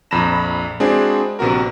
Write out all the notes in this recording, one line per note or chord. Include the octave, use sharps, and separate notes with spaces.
A#1 F2 A#5 B5 A#6 E7
G#3 C4 D4 E4 F#4 G#4
A#1 C3 B3 F#4 A#4